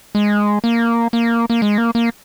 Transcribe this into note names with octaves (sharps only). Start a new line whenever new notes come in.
G#3
A#3
A#3
A#3
G#3
A#3
A#3